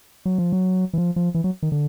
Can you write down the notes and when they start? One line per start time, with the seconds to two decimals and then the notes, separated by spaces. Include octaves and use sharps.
0.25 F#3
0.38 F3
0.52 F#3
0.93 E3
0.98 F3
1.16 F3
1.34 E3
1.44 F#3
1.63 D#3
1.72 D3